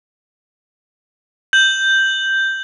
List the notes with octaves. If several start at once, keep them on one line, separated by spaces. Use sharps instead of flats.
G6 F#7